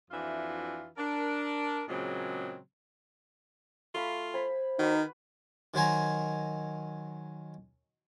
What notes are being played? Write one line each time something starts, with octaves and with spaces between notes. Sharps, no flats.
F2 E3 D4 F4 F#4 E5
D4 A#4
A#2 C#3 F#3 G#3 A#3 C4
A3 F4 F5 B5
C5 G#5 B5
D#3 D#4 F#4 B4
D#3 F#3 C5 G#5 A#5